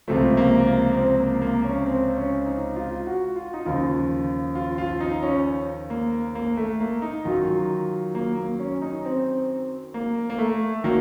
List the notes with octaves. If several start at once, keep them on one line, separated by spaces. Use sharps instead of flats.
C#2 C3 F3 A3
A#3
A#3
C4
A#3
A#3
C#4
C4
C#4
D#4
F4
F#4
F4
D#4
D#2 C#3 F3 F4
F4
F4
D#4
C#4
A#3
A#3
A3
A#3
D#4
F#2 D#3 F#3 F4
A#3
A#3
C#4
D#4
C4
A#3
A#3
A3
D#3 F#3 A#3